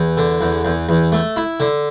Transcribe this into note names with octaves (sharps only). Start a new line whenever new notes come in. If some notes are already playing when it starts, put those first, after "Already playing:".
Already playing: E2
D3
E2
E2
E2
A3
E4
D3